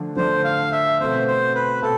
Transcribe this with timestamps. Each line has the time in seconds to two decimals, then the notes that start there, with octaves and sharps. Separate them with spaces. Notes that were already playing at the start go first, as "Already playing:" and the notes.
Already playing: D3 F3 A3 D4
0.16 D3 F3 A3 D4 C5
0.44 F5
0.72 E5
1.00 B2 A3 C4 C5
1.28 C5
1.55 B4
1.82 B2 A4